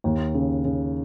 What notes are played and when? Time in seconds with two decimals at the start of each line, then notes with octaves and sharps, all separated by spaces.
0.04 D#2
0.34 C#3
0.65 C#3